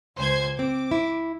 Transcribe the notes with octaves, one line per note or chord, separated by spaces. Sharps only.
C#2 C5 G#6
C4 D6
E4